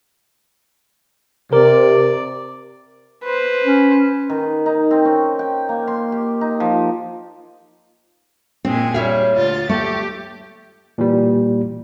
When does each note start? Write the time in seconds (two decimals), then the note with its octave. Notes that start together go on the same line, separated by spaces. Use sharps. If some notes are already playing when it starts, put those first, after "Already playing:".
1.53 C3 A#4 D5
3.24 B4 C5
3.64 C#4
4.30 D#3
4.66 D#4
4.91 C4
5.05 C#4
5.39 G5
5.69 A#3
5.87 C6
6.12 G4
6.41 D#4
6.60 F3
8.65 A#2 G#3 C4 G#4
8.94 G3 C#5 E5 F5
9.34 D2 F4 A6
9.69 A3 G4
10.98 A#2 E3 G3